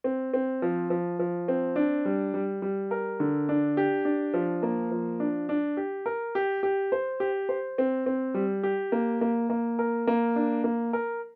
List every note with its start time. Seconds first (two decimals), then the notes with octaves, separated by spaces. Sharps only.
0.04 C4
0.34 C4
0.62 F3
0.90 F3
1.19 F3
1.48 C4
1.76 D4
2.05 G3
2.34 G3
2.62 G3
2.91 A#4
3.20 D3
3.49 D4
3.77 G4
4.05 D4
4.34 F3
4.63 A#3
4.92 F3
5.20 D4
5.49 D4
5.77 G4
6.06 A#4
6.35 G4
6.63 G4
6.92 C5
7.20 G4
7.49 C5
7.78 C4
8.06 C4
8.34 G3
8.63 G4
8.92 A#3
9.21 A#3
9.50 A#3
9.79 A#4
10.07 A#3
10.36 D4
10.64 A#3
10.93 A#4